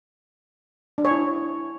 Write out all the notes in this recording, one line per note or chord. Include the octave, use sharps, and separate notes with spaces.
D4
C#5
E4